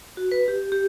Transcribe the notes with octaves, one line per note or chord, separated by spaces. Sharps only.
F#4
B4
G4
G4